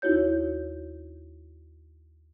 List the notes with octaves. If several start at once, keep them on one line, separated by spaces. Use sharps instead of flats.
D#2 D#4 E4 F#4 C#5 G6